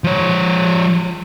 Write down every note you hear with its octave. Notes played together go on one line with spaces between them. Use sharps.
F3 C#5